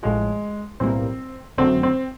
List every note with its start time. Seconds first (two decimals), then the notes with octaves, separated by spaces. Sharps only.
0.03 A1 A2 F3 G#3
0.80 B1 A2 E3 G3 A#3 C4
1.58 G#1 F#2 D3 F#3 A3 C4
1.83 C4